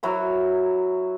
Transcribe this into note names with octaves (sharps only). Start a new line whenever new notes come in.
F#3 E4 F#4 A#4